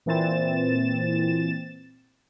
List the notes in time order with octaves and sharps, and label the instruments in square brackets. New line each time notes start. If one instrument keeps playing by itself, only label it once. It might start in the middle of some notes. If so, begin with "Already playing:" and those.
[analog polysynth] A#2 E3 C4 A6 E7